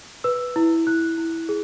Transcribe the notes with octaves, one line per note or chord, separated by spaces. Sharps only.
B4 E6
E4
E4 F#6
E4
G#4